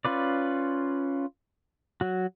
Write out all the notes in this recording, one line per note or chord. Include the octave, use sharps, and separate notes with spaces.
C#4 F4 B4 D5
F#3 F#4